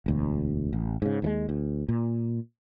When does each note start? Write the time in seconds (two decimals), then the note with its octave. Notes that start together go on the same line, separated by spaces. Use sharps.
0.06 E1 D2
0.73 A1
1.02 G#2 C#3
1.22 D#2 E3 G#3
1.49 D2
1.89 A#2